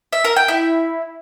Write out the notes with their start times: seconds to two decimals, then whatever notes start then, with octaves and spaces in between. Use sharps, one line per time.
0.12 E5
0.24 A#4
0.36 G5
0.48 E4